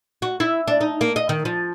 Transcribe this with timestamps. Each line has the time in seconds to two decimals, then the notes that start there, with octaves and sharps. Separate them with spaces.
0.22 F#4
0.40 E4
0.68 D4
0.81 D#4
1.01 A#3
1.16 D#5
1.29 D#3
1.45 F3